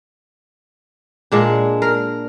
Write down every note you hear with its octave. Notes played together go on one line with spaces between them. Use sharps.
A#2 G#3 D4
A#4